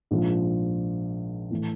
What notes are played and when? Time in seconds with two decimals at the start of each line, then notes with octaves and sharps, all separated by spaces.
0.11 A#1 G#2 F3
1.50 A2 E3